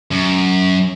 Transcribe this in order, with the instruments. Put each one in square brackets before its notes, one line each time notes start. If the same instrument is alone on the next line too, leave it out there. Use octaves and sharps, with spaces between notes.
[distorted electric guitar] F#2